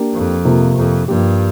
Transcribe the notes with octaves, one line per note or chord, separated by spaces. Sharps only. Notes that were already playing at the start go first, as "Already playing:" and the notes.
Already playing: A#3 D4 G4
F2
C3 A#3 F4
F2
G2 F3 A#3 G4